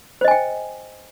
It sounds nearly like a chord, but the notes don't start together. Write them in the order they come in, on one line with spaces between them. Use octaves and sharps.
C5 D#5 G#5 G5